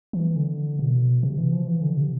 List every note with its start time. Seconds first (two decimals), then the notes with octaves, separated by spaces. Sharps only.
0.13 E3
0.36 D3
0.79 B2
1.23 C3
1.38 E3
1.52 F3
1.67 E3
1.82 D3
1.97 C3